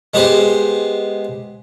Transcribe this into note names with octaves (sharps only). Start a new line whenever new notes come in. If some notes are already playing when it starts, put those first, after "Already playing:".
G#3 B3 G4 C5